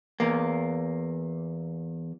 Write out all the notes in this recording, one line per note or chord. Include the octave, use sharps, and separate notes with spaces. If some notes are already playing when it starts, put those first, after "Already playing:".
E2 A#3